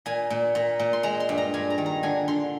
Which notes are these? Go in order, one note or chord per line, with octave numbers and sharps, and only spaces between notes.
A#2 G#5
A#2
A#2
A#2
C6
G#3 A#5
C6
G2
A#5
G2 G#5
A#5
D#3
A#5
D3 G#5
D3 C6